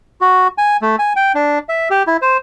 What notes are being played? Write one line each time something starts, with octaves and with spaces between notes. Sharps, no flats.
F#4
G#5
A3
G#5
G5
D4
E5
G4
E4
C5